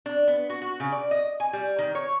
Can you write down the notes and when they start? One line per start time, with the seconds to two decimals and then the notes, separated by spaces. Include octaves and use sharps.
0.06 D4
0.28 B3
0.50 F#4
0.62 F#4
0.80 C#3
0.92 D5
1.11 D#5
1.40 G#5
1.53 G3
1.79 D#3
1.95 C#5